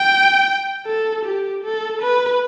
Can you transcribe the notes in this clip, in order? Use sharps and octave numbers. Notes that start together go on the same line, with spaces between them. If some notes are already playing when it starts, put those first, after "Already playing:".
Already playing: G5
A4
G4
A4
B4